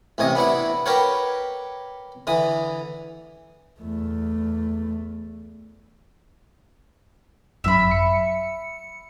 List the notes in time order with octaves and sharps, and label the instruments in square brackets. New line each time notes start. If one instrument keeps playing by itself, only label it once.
[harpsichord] A1 A2 C3 C#5 D#5
B3 D4 E4 F#5
G4 A#4 B4 C#5 F#5
D3 E3 D#6
[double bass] E2 A3
[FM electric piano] G#1 F#2 [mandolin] E5 B5
[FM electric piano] C#7